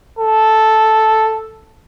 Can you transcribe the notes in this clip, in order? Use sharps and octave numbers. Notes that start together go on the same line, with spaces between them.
A4